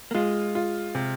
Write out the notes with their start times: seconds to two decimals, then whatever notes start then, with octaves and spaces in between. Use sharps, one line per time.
0.11 A#3
0.14 G#3 F4
0.55 F4
0.95 C3